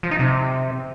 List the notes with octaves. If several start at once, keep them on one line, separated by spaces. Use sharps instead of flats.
F3
D#4
C3